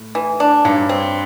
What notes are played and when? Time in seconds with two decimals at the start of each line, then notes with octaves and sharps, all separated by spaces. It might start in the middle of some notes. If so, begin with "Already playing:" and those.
Already playing: A2
0.15 E3
0.40 D4
0.65 G2 F#3
0.89 C4